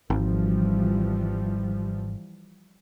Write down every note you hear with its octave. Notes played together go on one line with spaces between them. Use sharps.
G#1 E3 F3 G3